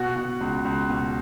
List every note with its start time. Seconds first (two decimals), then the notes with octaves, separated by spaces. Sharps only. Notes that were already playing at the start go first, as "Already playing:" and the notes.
Already playing: B2 F#4 F#5
0.16 B2
0.41 C#2
0.65 C#2
0.90 B2